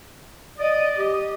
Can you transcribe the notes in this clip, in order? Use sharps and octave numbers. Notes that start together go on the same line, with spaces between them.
D5 D#5
G4 D#5